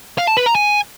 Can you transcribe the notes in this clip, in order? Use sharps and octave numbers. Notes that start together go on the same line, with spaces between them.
F5
A5
B4
A#5
G#5